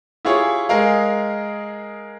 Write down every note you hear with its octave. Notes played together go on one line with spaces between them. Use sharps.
E4 F4 G4 G#4 C#5
G#3 G#4 A#4 F5